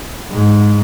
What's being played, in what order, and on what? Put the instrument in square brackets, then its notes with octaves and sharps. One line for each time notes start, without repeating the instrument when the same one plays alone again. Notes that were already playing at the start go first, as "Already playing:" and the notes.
[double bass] G#2